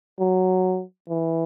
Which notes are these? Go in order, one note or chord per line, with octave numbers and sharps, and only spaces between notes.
F#3
E3